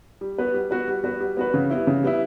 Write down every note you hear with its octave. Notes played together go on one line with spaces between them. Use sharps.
G3
B3 F#4 B4
G3
B3 F#4 B4
G3
B3 F#4 B4
G3
B3 F#4 B4
C#3
G3 B3 E4
C#3
G3 B3 E4